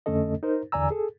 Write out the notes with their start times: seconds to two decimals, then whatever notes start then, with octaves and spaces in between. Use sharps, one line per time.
0.06 F2 D3 A3 C#4 A4 D#5
0.43 D#4 A#4 C5
0.72 E2 D3 D5 G#5 A#5 E6
0.91 G#4 A4